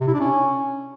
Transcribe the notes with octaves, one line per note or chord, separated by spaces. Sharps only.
C3
E4
D4
C#4